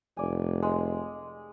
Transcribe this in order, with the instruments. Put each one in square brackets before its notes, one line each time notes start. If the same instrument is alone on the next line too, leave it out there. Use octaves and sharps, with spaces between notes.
[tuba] F1 [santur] D5 G#5
[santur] G#3